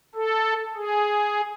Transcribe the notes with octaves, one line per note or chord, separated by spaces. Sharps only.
A4
G#4